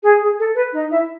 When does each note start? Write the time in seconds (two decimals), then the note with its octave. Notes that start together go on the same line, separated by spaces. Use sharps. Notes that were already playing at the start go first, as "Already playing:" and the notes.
0.03 G#4
0.21 G#4
0.38 A4
0.55 B4
0.73 D#4 D#5
0.91 E4 E5